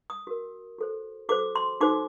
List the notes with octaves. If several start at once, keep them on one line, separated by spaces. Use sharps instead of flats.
D#6
F#4 A#4
F#4 A4 C5
F#4 A4 C5 D6
C6
D#4 F#4 A4 C5 D6